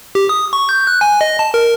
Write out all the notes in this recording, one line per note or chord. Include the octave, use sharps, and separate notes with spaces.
G4
D#6
C#6
G6
F#6
G#5
D#5
A5
A#4